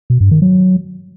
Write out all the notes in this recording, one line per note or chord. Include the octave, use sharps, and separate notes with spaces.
B2
G2
D#3
F#3